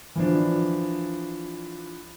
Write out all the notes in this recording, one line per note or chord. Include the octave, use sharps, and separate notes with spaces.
E3 F3 D4